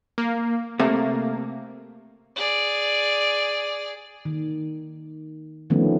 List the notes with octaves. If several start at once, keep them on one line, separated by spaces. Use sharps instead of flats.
A#3
C3 A3 A#3
G#4 D5
D#3
D3 D#3 F3 A3 B3 C#4